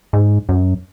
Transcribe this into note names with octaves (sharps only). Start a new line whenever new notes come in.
G#2
F#2